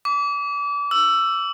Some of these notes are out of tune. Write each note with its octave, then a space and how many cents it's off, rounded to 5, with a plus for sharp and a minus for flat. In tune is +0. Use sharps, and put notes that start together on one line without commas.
D6 -35
E6 +15